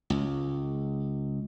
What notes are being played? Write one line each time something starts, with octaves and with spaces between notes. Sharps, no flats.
C#2